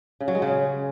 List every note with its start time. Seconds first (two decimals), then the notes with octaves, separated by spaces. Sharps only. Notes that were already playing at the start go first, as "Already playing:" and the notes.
0.20 C#3
0.28 F#3
0.35 G#3
0.42 C#3